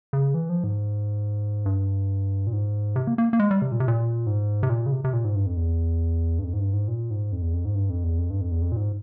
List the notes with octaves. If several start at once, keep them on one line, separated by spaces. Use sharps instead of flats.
C#3
E3
F3
G#2
G2
A#2
G#2
C3
A#3
A#3
A#3
G#3
G3
C3
A#2
C3
A#2
G#2
C3
A#2
C#3
C3
C3
A#2
G#2
G2
F2
E2
G2
F2
G#2
G2
G#2
A#2
G#2
F2
E2
F2
G#2
G2
F2
E2
F2
G2
F2
E2
F2
A#2
G#2